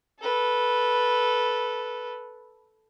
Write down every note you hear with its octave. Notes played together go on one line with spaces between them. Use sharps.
A4 B4